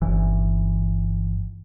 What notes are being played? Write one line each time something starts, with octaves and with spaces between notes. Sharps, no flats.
G1 E3